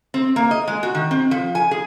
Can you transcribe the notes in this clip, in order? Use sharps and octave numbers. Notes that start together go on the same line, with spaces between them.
C4
A#3
D#5
G#3
F#4
D#3
C4
F3
G#5
G#4